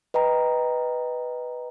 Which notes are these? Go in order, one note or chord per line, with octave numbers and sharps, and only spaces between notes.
B4 D#5 G5 A#5